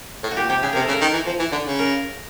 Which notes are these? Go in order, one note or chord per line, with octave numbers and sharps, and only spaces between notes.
A2
F#4
A#2 G4
C3 G4
C#3 G#4
C3 A#4
A4
C#3
A#4
D#3
E3
F3
E3
D3
C#3
A#4